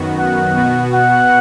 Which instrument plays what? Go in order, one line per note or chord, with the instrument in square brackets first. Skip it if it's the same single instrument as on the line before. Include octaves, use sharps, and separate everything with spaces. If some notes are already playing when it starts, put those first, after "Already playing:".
Already playing: [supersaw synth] F#2 D#3 B3 F#4
[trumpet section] F#5
[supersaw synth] B2 B3 F#4
[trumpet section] F#5